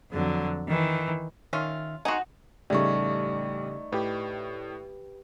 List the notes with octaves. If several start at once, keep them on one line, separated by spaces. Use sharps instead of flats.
F2 D3 F#3
D#3 E3
D#3 C#4 F4 E5 F6
D#4 F#4 F#5 G#5 C6
A1 C#3 G3 A3 D#4 G4 D5 C#6
A2 G4 B4